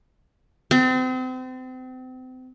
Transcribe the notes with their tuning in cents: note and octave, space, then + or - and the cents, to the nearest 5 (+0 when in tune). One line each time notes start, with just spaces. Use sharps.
C4 -35